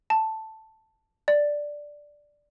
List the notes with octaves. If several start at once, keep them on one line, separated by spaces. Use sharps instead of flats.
A5
D5